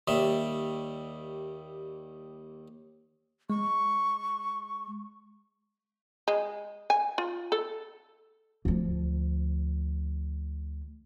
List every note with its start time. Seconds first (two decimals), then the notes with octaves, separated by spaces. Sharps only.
0.08 D#2 G3 E5
3.50 G#3 C#6
6.28 G#3
6.90 G#5
7.18 F4
7.52 A4
8.65 D2 F3